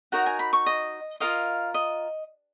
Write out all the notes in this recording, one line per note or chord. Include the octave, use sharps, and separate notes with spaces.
D#4 F#4 A#4 C#5 F#5
G#5
B5
C#6
D#5
F4 A#4 D#5 F5
D#5